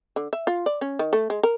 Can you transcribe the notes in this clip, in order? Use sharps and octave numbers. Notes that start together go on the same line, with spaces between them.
D3
E5
F4
D5
C#4
D#3
A3
G#3
A#4